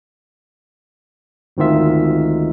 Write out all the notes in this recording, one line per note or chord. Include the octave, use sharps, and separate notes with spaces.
G#1 D2 G#2 D#3 F4 E5